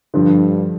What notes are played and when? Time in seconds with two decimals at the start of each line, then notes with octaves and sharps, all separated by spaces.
0.14 G2 D3 F3